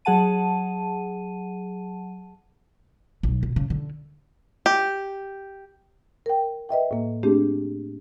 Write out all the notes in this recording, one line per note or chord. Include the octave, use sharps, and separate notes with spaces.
F#3 G#4 F#5 A5 D#7
B1
B2
C#3
D3
G4
A#4 G5
B4 D#5 E5 G5
A2 A#3
A3 C4 D4 G4 G#4